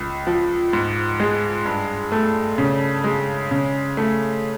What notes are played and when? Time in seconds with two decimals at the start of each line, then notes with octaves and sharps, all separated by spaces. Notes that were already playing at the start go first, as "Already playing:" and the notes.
Already playing: C#2
0.27 F3
0.73 G#2
1.20 G#3
1.65 G2
2.12 A3
2.58 C#3
3.04 G#3
3.51 C#3
3.97 A3